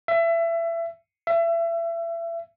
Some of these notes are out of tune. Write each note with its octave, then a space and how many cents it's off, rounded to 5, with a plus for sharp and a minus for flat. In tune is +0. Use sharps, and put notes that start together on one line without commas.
E5 +25
E5 +30